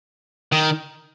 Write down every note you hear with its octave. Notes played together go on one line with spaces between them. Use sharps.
D#3